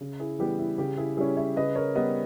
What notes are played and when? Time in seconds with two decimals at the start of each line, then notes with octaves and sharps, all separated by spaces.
0.01 C#3
0.20 E4 G#4
0.39 E3 G3 B3 G4
0.59 E4
0.78 C#3 G4
0.97 E4 G#4
1.17 G3 C#4 E4 G#4
1.37 C#5 E5
1.56 C#3 B4 D#5
1.75 A#4 C#5
1.95 G3 B3 B4 D#5